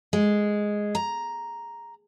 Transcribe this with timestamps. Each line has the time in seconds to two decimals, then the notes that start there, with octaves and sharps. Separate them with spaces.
0.13 G#3
0.95 A#5